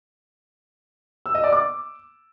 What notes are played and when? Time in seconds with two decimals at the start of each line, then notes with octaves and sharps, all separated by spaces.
1.26 E6
1.35 D#5
1.44 D5
1.53 D6